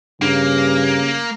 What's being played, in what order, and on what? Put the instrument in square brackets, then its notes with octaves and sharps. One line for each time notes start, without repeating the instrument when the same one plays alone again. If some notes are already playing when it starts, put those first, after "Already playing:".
[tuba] G2 [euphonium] C#3 [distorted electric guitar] A#3 [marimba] D4